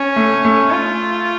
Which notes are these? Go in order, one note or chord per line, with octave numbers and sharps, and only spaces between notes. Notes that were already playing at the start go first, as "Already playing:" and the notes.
Already playing: C#4
A3
A3
F4